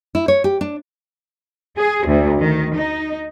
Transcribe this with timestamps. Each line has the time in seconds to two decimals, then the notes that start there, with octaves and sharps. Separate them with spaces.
0.15 E4
0.28 C#5
0.44 G4
0.61 D4
1.77 G#4
2.06 D2
2.39 D#3
2.74 D#4